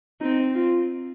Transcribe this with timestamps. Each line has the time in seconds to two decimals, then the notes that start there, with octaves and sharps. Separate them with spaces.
0.21 C4 D#4
0.54 F4